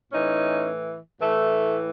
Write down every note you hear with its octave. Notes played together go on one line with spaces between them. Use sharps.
A2 E3 C#4 D#4
A2 E3 A3